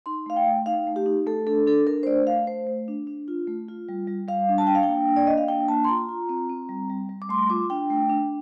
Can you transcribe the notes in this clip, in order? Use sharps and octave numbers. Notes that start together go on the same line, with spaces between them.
D#4 C6
A3 F5
G5
A3
D#4 F5
A3
G4
D#4
A3 A4
D4 A4
D4 A4
D4 A#4
C5
A3 D5
A3 F5
A3 C5
A3
D4
D4
F4
A3
F4
G3
G3
G3 F5
D4
A5
D4 G5
F5
G5
A#3
D4
D5
A#3 D#5
F5
D4 G5
A#3 A5
C6
F4 A#5
F4
C4
C4
G3
G3
G3
D6
A3 C6
F4 D6
D4 G5
A3
D4